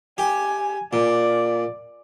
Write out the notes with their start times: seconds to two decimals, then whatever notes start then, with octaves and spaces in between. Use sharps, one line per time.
0.18 G4 G#5
0.93 A#2 D5